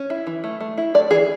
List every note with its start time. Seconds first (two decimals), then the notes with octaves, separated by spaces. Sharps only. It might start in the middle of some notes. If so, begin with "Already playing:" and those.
Already playing: C#4
0.10 E4
0.27 E3
0.44 A3
0.61 A3
0.78 E4
0.94 A3 D5
1.11 E3 G#4